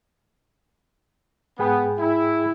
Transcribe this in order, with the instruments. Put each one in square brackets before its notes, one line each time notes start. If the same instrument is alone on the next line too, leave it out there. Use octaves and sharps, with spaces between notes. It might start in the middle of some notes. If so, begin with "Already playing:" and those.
[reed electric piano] G#2 G#4 G5 [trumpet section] B3
[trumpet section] E4